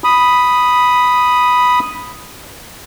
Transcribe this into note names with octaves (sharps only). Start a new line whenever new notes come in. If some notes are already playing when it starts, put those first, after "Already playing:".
B5 D#6